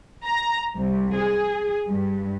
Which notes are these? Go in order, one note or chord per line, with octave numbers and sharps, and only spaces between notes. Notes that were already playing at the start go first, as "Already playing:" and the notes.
A#5
C2
G#4
G2